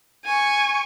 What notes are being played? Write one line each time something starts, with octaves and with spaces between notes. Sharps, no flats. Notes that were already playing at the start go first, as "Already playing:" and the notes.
G#5 C#6